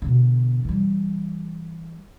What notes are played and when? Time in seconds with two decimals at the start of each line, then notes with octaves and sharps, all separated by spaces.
0.02 B2 D3
0.65 E3 G3